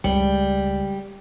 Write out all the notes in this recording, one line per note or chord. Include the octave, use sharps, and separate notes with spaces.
C#2 G3